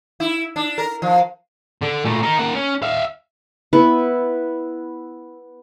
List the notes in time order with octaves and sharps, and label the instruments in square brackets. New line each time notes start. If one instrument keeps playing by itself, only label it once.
[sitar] E4
D4
A#4
F3
[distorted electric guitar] D3
A#2 A3
D#4 A#4
A#3 F#5
C#4
E5 F5
[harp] B3 [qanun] E4 B4